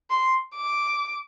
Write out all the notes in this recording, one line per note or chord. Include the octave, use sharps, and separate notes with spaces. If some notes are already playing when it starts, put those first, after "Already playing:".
C6
D6